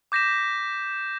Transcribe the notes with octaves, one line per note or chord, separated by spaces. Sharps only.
D6 G6 A#6 B6 E7